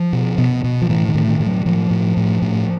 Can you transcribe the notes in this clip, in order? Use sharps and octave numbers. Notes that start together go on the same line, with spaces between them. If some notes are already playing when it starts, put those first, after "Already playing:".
Already playing: F3
B2
B2
B2
F3
A2 E3
D#3
A2
D#3
A2
F#3
A2 F3
A2
A2
A2